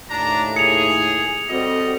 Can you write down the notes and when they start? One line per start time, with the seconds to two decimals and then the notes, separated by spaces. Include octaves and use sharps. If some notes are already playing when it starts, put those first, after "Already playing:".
0.10 D#2 A2 D4 A#5
0.56 G#4 C#7 F7
1.49 G3 C4 F#4 A4 D#5